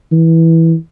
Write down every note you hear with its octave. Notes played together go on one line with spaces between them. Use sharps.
E3